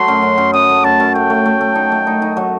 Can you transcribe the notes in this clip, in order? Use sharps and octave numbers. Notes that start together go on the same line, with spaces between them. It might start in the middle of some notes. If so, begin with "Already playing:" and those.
Already playing: F#3 A3 C6
F#2
F#2
F#2
F#2 D#6
A3
F#2 A5
F#2
A3 G5
A3
A3
A3
D#4
A3
D#4
D#4
F#3